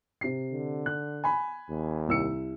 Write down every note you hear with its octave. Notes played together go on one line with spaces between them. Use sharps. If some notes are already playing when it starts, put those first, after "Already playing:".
C3 C7
D3
F#6
G#5 B5
D#2
C2 E6 C#7